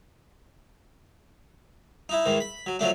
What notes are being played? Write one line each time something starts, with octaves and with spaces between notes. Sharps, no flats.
D#4 E4
G#2 D#3 E3
B5
F#3
F3 F#3 A3 D4